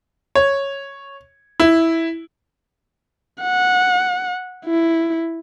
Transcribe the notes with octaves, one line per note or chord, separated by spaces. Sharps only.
C#5
E4
F#5
E4